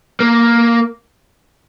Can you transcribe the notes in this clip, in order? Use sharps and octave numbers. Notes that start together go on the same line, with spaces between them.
A#3